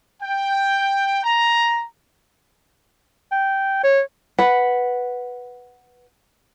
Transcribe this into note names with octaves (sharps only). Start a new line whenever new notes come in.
G5
A#5
G5
C#5
B4 F#5